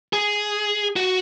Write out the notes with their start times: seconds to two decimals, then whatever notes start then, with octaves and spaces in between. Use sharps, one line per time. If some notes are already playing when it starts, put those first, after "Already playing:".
0.13 G#4
0.96 F#4